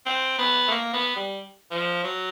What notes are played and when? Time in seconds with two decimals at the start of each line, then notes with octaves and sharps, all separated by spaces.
0.06 C4
0.39 B3
0.68 A3
0.71 A#3
0.93 B3
1.16 G3
1.71 F3
2.04 F#3